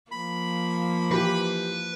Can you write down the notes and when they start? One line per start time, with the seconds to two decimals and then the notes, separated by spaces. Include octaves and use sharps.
0.11 F3 A#3 B5
1.12 E3 G4 B4